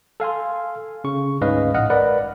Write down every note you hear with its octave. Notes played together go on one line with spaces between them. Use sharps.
A4 F5 G#5 C6
C#3 C#6
D2 G#2 C#4 B4 D#5 F5
A#1 A2 D#5 F#5 F6
A#4 B4 D5 F#5 B5